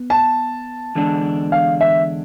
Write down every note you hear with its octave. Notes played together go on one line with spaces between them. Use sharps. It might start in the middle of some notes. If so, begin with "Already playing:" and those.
Already playing: B3
A5
E2 D3 G#3 D4
F5
E5